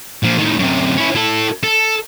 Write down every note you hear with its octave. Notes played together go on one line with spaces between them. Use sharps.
A#2 F3
A2 D#3
F#2 C3
C#4 E4
E4 A4
A4